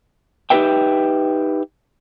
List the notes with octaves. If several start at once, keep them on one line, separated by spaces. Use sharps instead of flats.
D#4 G4 A#4 B4 E5 G5